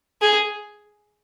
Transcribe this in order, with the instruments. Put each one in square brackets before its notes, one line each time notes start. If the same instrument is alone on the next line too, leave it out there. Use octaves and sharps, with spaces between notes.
[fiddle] G#4